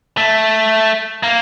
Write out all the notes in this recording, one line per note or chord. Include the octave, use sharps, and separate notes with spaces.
A3
A#3